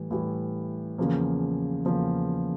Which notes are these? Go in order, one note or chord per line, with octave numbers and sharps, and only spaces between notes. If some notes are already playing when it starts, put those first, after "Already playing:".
Already playing: A2 E3 G3
A2 E3 G3
E2 C#3 F3 A#3
E2 C#3 F3 A#3